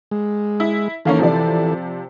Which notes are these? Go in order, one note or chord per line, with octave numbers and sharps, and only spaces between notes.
G#3
E4
D#3 E3 A#3 C#4 A4
C3 F3 D5